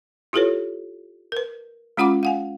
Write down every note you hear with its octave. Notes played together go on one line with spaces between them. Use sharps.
E4 F4 G4 A4 B4 C#5
A#4 B4
G#3 C#4 F4 F#5 B5 D6
F5 F#5 G#5